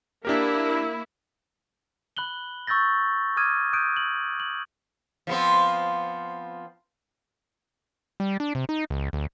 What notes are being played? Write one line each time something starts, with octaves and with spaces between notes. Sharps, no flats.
A#3 D4 E4 G4 A#4
B5 F#6 F#7 G7
C#6 E6 G6 A6 A#6
D6 D#6 F6 G#6 D#7
D#6 F#6 G6 D7 D#7
F#7
F#7
F3 B3 C4
G3
D4
C3
D#4
C#2
D2